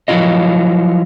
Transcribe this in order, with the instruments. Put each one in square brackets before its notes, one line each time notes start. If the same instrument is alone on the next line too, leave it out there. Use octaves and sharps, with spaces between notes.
[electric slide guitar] F3 F#3 E4 F4 D#5